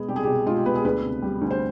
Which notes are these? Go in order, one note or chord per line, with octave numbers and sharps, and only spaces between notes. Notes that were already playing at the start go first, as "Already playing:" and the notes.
Already playing: B2 G#3 B3 G#4
C2 G4
G#4
G4
B2
G#3 F4
G4
B3 B4
G#4
D2 B4
C3
G3
D2
C5